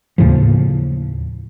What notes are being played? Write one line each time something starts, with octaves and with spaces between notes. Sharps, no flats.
D#2 A2 C#3 F3